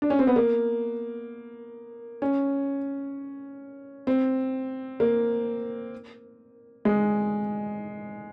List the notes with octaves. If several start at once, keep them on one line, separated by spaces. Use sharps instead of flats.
D4
C#4
C4
B3
A#3
C#4
C4
A#3
G#3